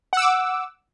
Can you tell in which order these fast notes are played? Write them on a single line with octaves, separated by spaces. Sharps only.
F#5 E6 D6